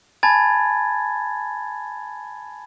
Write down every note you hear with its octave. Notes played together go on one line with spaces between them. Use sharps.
G#5 A5 B5 G#6 A6